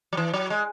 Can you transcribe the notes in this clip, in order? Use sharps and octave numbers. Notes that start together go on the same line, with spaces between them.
F#3
E3
F#3
G#3